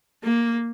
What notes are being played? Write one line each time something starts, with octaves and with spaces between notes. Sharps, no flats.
A#3